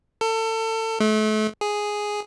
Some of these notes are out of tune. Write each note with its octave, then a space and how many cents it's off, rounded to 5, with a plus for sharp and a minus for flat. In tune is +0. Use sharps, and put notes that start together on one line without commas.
A4 +30
A3 -35
G#4 +0